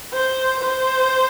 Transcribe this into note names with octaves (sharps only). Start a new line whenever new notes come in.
C5
C5